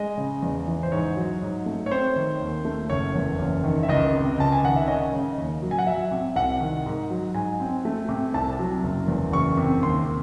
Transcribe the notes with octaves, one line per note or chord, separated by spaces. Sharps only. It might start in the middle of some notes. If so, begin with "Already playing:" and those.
Already playing: G#3 D#5
C#3
E2
E3
C5
G#2 C#5
F#3
G#2
A3
C#5
C4 C5
D#3
D#2
A3
F#1 C#5
E2
F#1
D#3
E5
C#2 D#5
C3
C#2 A5
G#5
D#3 F#5
E5
C#4 D#5
C#3
D#2
F#3
G#5
F#5
F#3 E5
C3
C2 F#5
D#3
G#2
F#3
G#2 G#5
C4
A3
C3
C2 A5
F#3
F#1
E2
F#1 C#6
C3
D#2 C6